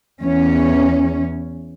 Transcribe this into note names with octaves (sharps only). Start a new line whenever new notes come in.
E2 C#4